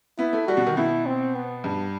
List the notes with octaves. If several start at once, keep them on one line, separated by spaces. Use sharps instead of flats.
B3 E4
A3
G3 F#4
B2
D#3
B2 E4
C4
B3
G2